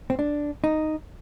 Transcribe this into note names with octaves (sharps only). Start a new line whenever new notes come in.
C4
D4
D#4